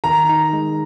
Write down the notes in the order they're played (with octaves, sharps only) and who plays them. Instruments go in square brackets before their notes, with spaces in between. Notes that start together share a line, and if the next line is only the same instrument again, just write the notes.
[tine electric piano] D#3 [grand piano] A#5
[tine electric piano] D#4
G#3